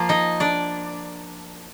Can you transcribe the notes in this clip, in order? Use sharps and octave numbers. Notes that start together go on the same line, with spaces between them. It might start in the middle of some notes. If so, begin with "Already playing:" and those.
Already playing: F3 A#3 F4 F5
D#4 D#5
D4 D5